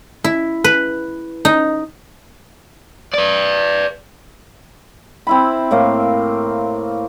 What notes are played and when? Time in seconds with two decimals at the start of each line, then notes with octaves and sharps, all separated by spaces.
0.24 E4
0.64 B4
1.45 D#4
3.14 B4 D5
5.27 C4 E4 B5
5.71 A2 A#3 F5